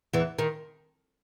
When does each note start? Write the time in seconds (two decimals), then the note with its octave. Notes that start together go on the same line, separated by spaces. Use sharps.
0.13 E2 E3
0.39 D#3